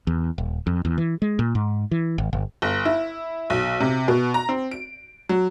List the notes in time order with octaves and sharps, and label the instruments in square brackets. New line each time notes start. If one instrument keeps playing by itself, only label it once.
[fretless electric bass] E2
D#1
F2
E2
E3
G#3
A#2
G#2
E3
G#1
G1
[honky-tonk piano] G1
E4
B1
C3
B2
A#5
C4
D7
F#3